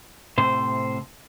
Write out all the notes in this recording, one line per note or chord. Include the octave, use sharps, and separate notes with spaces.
A2 C3 C5